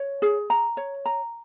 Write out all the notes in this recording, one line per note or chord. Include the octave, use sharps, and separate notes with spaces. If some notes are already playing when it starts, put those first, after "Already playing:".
Already playing: C#5
G#4
A#5
C#5
A#5